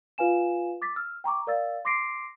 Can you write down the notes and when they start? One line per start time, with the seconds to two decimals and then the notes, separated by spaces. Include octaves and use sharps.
0.18 F4 B4 F5 G#5 E7
0.82 D6 A6 B6
0.96 E6 F6
1.24 G5 A#5 C#6 D6
1.47 A#4 D5 F5 E6 A6
1.85 C6 D6 A#6 C7 D7